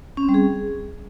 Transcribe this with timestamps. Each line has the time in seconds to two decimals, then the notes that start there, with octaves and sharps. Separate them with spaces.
0.17 C#4
0.23 C4
0.29 G3
0.34 G#4